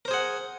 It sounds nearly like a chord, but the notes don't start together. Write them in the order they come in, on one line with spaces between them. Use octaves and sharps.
A#4 C5 G#4 F#5